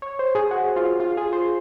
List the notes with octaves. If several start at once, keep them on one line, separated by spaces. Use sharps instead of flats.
C#5
C5
G#4
F#4
F4
F4
G#4
C5